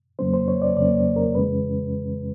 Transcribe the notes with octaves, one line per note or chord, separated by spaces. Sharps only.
F2 C#3 F#3 A#3 C#4 C5
C5
C#5
D5
F2 C#3 F#3 A#3 C#4 D5
A#4
F2 C#3 E3 G#3 C#4 B4